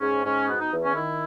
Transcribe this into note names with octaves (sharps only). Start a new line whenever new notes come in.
G#2 C#4
G#2 C#4
B2 B3
D#4
E2
C#4
D#3 E4